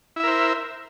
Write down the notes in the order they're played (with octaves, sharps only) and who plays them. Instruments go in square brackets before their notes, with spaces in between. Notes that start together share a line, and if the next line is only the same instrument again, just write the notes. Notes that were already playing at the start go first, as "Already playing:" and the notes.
[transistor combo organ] E4
E5
A#4
C5